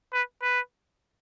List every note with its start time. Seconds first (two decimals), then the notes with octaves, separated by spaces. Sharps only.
0.13 B4
0.42 B4